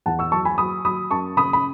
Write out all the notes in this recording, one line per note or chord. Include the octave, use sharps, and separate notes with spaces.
E2 F#5 A5
C#6 E6
F#3 A5 C#6
G#5 B5
F#3 B5 D#6
F#3 B5 D#6
F#2 A5 C#6
C#3 B5 D#6
B5